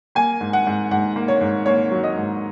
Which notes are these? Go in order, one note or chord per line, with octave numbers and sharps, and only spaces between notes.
A#3 G#5
G#2
F#5
G#2
G#2 F#5
A#3
C#5
G#2
A#3 C#5
F#3
D#5
G#2